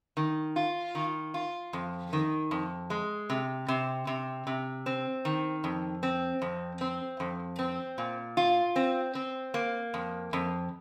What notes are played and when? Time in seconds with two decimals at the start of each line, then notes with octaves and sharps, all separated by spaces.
0.17 D#3
0.56 F4
0.95 D#3
1.34 F4
1.73 F2
2.13 D#3
2.51 F2
2.90 G#3
3.30 C3
3.68 C3
4.07 C3
4.47 C3
4.86 C4
5.25 D#3
5.64 F2
6.03 C4
6.42 F2
6.81 C4
7.20 F2
7.59 C4
7.98 A#2
8.37 F4
8.76 C4
9.15 C4
9.54 A#3
9.94 F2
10.33 F2